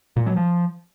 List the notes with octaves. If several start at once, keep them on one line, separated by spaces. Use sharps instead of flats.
A#2
F#3
F3